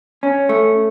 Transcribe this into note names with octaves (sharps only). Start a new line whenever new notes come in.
C#4
A3